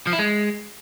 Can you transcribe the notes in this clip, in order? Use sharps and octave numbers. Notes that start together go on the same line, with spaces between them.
F3
E4
G#3